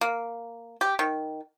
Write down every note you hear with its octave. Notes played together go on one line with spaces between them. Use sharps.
A#3
G4
D#3